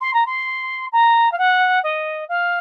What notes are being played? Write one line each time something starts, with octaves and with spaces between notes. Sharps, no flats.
C6
A#5
C6
A#5
F5
F#5
D#5
F5